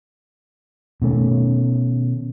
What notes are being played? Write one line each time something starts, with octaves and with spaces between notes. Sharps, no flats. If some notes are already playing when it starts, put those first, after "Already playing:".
B2 D#3 A3 C#4